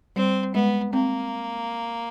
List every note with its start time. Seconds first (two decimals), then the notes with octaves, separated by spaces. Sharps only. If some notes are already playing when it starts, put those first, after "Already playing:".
0.16 G3 C4
0.55 G#3 B3
0.93 A#3 C4